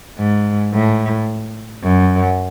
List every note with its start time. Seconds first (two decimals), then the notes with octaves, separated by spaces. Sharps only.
0.18 G#2
0.73 A2
1.83 F#2